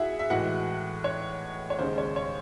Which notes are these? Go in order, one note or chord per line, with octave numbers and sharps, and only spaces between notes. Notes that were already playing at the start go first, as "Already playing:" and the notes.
Already playing: E4 F#4 G#4 E5 F#5
E5
A2 E3 G#3 F#4 F#5
C#5
C#5
D#2 C#3 G#3 C5
C#5
C#5